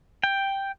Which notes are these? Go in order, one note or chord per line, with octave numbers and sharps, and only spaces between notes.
G5